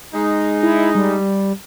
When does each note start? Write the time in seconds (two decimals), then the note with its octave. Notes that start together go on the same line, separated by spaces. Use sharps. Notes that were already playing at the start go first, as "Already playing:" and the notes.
0.15 G#3 D#4
0.63 E4
0.95 G3